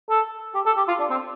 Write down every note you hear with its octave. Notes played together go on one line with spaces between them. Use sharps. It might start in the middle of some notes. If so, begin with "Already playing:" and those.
A4
G4
A4
G4
F4
D4
C4